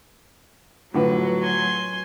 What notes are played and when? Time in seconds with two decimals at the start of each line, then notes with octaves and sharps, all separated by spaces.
0.94 A2 D3 F3 F#3 B4
1.42 G#5 C6